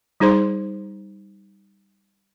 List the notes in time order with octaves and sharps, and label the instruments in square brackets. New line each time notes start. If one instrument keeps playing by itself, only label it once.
[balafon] G3 D#4 G#4 C5 C6